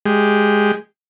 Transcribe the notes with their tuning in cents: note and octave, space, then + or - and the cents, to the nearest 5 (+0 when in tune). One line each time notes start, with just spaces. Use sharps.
G#3 +0 G4 +0